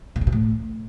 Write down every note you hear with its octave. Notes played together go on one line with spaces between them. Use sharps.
C3
D3
B2
A2